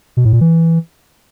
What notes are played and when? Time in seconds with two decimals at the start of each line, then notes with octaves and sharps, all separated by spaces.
0.17 B2
0.25 A2
0.33 A#2
0.41 E3